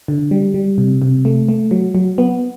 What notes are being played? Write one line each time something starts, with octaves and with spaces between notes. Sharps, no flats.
D3
G3
G3
C3
C3
A3
A3
F#3
F#3
B3